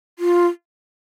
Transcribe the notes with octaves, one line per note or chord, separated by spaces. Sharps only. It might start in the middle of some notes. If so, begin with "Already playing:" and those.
F4